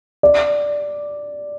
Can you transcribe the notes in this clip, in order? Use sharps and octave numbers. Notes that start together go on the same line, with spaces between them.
D5